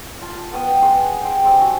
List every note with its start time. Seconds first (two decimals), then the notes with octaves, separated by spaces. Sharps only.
0.22 F4 A5
0.52 B3 F#5 G5 D#6
0.82 G#4 F#5 C6 D#6
1.22 G5 C6
1.42 G3 C4 D4 G#4
1.61 F#4